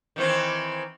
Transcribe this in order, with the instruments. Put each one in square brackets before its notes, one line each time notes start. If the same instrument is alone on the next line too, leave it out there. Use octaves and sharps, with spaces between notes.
[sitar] D#3 E3 C4